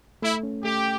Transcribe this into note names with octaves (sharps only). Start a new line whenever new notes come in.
A3 E4
C#4
A3 G4